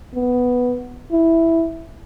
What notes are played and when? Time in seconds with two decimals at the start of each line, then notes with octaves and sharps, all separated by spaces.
0.15 B3
1.12 E4